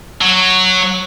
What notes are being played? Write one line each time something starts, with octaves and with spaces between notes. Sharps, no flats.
F#3